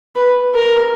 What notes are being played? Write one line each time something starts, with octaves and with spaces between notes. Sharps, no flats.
B4
A#4